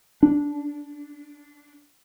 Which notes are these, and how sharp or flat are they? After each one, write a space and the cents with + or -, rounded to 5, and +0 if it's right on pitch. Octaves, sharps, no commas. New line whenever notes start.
D4 -15